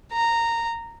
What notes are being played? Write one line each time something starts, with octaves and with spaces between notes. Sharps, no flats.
A#5